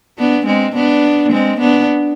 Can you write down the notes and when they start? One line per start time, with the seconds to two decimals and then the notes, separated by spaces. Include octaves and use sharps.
0.18 B3 D4
0.46 G#3 C4
0.75 B3 D4
1.32 G#3 C4
1.60 B3 D4